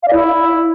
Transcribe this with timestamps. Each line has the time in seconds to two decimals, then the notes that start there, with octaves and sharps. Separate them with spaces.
0.03 F5
0.08 D5
0.13 E4